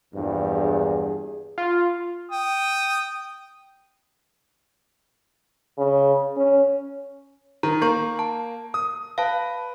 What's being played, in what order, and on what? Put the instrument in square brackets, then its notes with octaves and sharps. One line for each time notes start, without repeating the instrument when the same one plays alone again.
[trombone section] A#1 E2 G2
[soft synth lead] G#4
[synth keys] F4
[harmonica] G5 D#6
[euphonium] C#3
C#4
[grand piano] D#3 [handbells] A#5
[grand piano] A#3 [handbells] A#5 C#6 G6
[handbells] A5
[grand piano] D#6
[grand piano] B4 [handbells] F5 A5